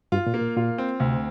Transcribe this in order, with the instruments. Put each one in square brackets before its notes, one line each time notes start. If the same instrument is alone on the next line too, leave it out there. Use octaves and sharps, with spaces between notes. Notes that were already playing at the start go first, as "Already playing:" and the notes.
[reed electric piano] G2 [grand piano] F4
[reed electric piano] A#2
[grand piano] A#3
[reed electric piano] A#2
[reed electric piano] A#2 [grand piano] F4
[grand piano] C4
[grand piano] D2 [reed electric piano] C3